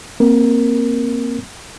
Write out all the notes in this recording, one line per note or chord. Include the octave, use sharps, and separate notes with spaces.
A#3 C4 A#4